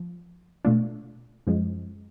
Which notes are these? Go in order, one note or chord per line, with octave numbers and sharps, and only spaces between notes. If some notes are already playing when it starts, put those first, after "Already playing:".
Already playing: F3
B2 A3 D4 F4
F#2 F3 G#3